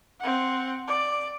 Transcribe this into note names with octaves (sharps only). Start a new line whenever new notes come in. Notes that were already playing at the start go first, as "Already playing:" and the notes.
C4 F#5
D5